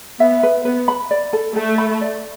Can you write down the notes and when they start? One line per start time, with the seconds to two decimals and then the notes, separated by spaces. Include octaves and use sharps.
0.20 B3 E5
0.43 B4
0.65 B3 B4
0.88 B5
1.11 D5
1.33 A4
1.55 A3 A4
1.78 B5
2.01 D5